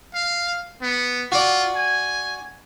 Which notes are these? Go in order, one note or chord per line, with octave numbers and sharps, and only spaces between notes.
F5
B3
F4 F#4 D5
G#5